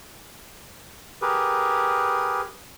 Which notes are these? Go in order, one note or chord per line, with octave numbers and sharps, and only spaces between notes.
G4 G#4 A#4 B4